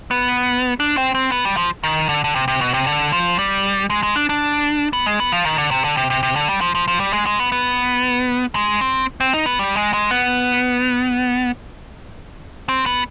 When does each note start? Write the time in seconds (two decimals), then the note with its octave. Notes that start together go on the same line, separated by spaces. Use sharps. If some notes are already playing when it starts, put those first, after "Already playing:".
0.11 B3
0.80 D4
0.97 C4
1.15 C4
1.32 B3
1.45 G3
1.57 F3
1.84 D#3
2.09 D3
2.24 D3
2.35 C3
2.48 C3
2.61 B2
2.74 C3
2.87 D3
3.12 F3
3.39 G3
3.90 G#3
4.03 G#3
4.16 D4
4.29 D4
4.93 B3
5.06 G#3
5.20 B3
5.32 F3
5.45 D#3
5.58 D3
5.71 C3
5.84 D3
5.97 C3
6.10 C3
6.23 C3
6.36 D3
6.49 G3
6.61 F3
6.75 F3
6.88 F3
7.00 G3
7.13 G#3
7.26 G#3
7.40 B3
7.52 B3
8.55 G#3
8.81 C4
9.20 C4
9.34 D#4
9.46 B3
9.59 G3
9.76 G#3
9.94 G#3
10.11 B3
12.69 C4
12.86 B3